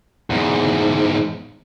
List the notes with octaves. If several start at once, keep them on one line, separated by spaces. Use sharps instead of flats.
E2 G#2